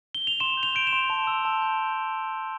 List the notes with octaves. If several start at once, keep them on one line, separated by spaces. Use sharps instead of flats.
G7
F7
C6 E7
G6
F7
G6 D7
E7
C6
A5
E6
A5
G6
A5